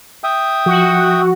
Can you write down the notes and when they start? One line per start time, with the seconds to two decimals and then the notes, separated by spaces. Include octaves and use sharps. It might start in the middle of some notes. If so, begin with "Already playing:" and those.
0.24 E5 G5 D#6
0.66 F3 F#4